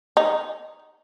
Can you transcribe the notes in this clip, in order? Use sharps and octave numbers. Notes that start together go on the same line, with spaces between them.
D#4